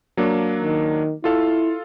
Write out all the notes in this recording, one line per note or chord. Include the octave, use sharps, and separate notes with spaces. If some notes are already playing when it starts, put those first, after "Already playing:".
F#3 A#3 D4
D#3
E4 F4 A4 F5